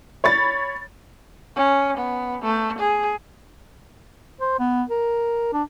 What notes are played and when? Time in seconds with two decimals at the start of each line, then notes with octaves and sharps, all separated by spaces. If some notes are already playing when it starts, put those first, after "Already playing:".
0.24 C#5 B5 A6
1.56 C#4
1.97 B3
2.42 A3
2.79 G#4
4.40 C5
4.59 B3
4.89 A#4
5.53 D4